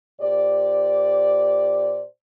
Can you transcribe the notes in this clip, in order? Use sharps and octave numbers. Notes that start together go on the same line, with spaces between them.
A#2 G4 C5 D5